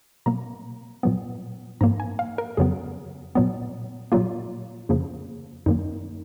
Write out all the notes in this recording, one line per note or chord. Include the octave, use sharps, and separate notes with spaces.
B2 F#3 A#3 A#5
A#2 F#3 B3
G#2 F3 A#3 A#5
G#5
F5
A#4
F2 C#3 F#3 B3 G#4
A#2 F#3 B3
A#2 F#3 A#3 F4
F2 C#3 F3 A#3
F#2 D#3 F#3 A#3 D#4